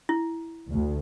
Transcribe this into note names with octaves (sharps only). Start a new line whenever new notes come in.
E4
D2